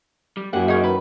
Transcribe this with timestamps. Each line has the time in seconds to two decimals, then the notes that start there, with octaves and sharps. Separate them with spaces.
0.37 G3
0.53 F#2 A#3 E4 G4 F#5
0.68 G#3 C#4 D#4
0.84 D#3 B4